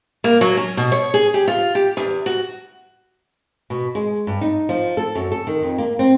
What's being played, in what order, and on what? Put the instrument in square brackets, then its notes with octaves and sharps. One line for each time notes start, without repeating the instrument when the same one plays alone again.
[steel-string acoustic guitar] A#3
F#3
C#4
B2
C#5
G#4
G4
F4
G4
E2
F#4
[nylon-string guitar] B2
G#3
G2
D#4
F3
A4
F#2
A4
D#3
F2
A#3
C4